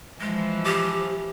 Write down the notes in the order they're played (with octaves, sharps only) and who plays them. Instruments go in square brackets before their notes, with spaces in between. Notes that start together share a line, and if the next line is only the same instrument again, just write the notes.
[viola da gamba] E3 F3 [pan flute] G#3
[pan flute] G4